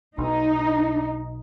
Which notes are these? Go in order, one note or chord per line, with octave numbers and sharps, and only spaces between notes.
B1 D#4